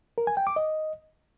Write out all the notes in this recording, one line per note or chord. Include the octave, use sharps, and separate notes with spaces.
A#4
G#5
G5
D6
D#5